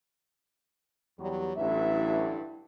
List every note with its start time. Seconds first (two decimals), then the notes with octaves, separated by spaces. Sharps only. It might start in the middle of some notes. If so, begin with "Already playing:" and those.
1.19 E2 F#3 G3
1.56 A1 G2 D3 F#3 E4 E5